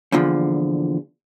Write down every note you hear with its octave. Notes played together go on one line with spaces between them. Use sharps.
E2 A#2 D3 F3